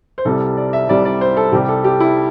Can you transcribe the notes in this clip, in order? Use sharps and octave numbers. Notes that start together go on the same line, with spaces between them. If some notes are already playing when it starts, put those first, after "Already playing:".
C5
C2 C3 G3 A4
D5
E5
C2 C3 G3 D5
D5
C5
A4
C2 C3 G3 G4
A4
G4
E4